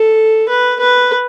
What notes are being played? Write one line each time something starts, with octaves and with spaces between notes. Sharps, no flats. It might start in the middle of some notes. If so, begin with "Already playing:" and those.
Already playing: A4
B4
B4